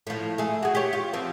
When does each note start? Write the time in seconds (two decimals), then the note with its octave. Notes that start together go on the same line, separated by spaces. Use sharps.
0.07 A2 F3
0.38 A3 G#4
0.63 F#4 G#4
0.75 G4 C#5
0.93 F4
1.13 F3 C4